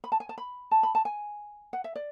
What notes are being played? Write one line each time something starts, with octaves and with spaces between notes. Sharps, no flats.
B5
A5
G#5
A5
B5
A5
B5
A5
G#5
F#5
E5
D5